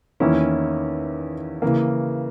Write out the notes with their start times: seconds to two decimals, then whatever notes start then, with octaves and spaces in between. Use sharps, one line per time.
0.20 E2 D#3 A#3 C#4 E4
1.62 C#3 E3 A#3